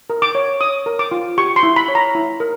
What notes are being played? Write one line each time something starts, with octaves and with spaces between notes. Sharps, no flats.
A#4
D6
C#5
C#5 D#6
A#4
D6
F4
G4 C#6
C6
E4
B5
C#5
A#5
E4
A#4